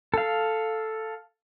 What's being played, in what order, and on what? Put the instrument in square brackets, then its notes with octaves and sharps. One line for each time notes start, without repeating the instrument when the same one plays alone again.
[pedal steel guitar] A4 F5